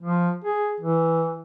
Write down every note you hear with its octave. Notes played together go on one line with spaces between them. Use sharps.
F3
G#4
E3